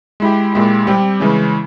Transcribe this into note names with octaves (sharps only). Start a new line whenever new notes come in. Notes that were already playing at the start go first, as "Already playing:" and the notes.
G#3 E4 G4
A#2 G#3 E4 G4
G3 C4 G4
C#3 E3 G#3 C#4